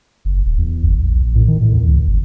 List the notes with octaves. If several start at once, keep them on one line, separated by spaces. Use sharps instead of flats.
F#1
D#1
E2
G1
A#1
A#1
A2
D#3
A2
E2
C#2
G1